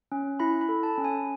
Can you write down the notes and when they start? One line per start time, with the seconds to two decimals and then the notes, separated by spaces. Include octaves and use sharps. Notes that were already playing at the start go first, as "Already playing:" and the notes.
0.12 C#4
0.40 E4 B5
0.61 B5
0.69 A4
0.83 A5
0.98 C#4
1.04 G#5